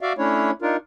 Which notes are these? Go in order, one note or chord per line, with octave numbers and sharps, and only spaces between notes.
F#4 D5 E5 F5
A3 C#4 D4 E4 C#5
D4 D#4 F4 A#4